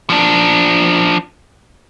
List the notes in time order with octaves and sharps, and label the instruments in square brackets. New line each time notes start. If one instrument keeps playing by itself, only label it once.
[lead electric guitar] F3 D4